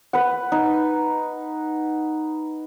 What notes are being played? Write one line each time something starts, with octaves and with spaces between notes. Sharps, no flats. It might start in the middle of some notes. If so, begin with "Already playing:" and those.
B4 F#5
D#4